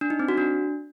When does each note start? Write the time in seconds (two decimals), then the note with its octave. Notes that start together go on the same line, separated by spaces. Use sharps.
0.01 D4
0.10 D#4
0.19 C4
0.28 F#4
0.38 D4